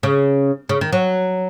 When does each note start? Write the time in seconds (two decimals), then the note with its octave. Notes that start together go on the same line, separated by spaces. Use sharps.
0.03 C#3
0.69 C#3
0.81 D#3
0.93 F#3